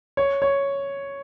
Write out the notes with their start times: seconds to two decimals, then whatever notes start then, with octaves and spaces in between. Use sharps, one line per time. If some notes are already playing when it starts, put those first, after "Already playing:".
0.17 C#5
0.42 C#5